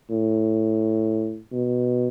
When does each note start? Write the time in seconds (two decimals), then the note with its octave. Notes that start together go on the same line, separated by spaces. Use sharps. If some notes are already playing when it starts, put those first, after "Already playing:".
0.10 A2
1.52 B2